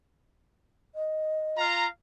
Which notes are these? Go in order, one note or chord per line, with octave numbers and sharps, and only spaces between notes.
D#5
F4 F5 A#5